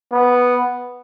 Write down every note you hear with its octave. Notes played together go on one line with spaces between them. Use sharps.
B3